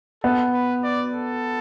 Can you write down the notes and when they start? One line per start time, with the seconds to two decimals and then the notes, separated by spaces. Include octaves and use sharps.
0.23 B3 A4
0.53 B4
0.84 D5
1.13 A4